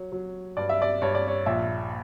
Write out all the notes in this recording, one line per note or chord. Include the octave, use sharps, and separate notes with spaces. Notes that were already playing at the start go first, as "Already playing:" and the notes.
Already playing: F#3 C#5
F#3
G2 D5
E5
D5
G2 C#5
D5
C#5
A#1 E5